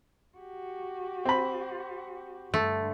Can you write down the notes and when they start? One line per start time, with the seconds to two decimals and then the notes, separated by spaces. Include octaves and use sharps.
0.38 F#4 G4
1.25 C4 B5
2.54 G2 D3 A3